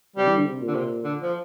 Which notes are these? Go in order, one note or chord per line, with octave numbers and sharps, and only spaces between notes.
C3 G3
E3
D3
C3
A#2
D3
C3
D3
F3